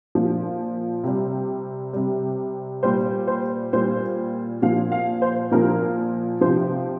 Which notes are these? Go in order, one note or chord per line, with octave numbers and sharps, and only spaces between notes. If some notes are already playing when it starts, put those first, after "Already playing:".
A#2 F3
C3 G3
C3 G3
A#2 G3 C5
C5
A#2 G3 C5
A#2 F3 F5
F5
C5
A#2 F3 A#4
C3 F3 C5